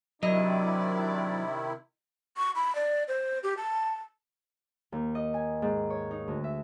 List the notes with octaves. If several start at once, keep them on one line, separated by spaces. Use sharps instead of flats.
C3 D#3 F#3 D4 E4 D5 D#5
C#6
B5
D5
C5
G4
A5
D#2
D#5
G#5
G#2
C#5
D#4
D2
E5